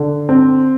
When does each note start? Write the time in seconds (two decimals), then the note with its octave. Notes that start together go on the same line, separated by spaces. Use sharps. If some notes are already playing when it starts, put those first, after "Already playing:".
Already playing: D3
0.29 C4